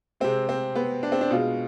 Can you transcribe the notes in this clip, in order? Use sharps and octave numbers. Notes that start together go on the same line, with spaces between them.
C3 G#3 C4
C4
B3
D4
C4
D4
B2 G#3 F4